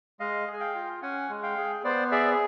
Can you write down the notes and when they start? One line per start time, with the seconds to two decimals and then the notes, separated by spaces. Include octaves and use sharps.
0.20 G#3 D#5 F5
0.48 G#4
0.53 G#5
0.60 F5 G5
0.75 F4
1.02 C#4 F#5 G#5
1.29 G#3
1.43 F5 G5
1.58 G#4
1.84 B3 C5 D5
2.12 G#4 D5 E5